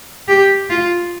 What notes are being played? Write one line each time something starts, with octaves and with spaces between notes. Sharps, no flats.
G4
F4